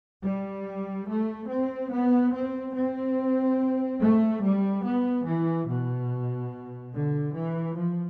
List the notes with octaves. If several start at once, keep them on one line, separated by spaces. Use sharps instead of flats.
G3
A3
C4
B3
C4
C4
A3
G3
B3
E3
B2
D3
E3
F3